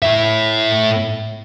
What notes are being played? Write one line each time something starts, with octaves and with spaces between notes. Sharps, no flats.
A2 E5